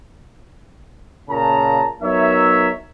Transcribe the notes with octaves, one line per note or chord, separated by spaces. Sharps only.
A#2 C#3 A5 A#5
F#3 B3 D#4 A#4 C#5 E5